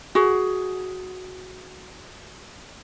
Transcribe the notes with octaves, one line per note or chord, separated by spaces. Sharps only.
F#4 G#4